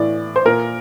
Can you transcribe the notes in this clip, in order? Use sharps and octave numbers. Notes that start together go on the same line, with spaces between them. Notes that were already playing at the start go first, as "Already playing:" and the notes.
Already playing: A2 E3 D5
C5
A#2 A#4